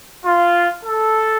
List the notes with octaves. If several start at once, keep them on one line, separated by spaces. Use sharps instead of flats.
F4
A4